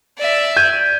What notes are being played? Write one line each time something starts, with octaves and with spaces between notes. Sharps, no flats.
D5 E5
G6 G#6 D#7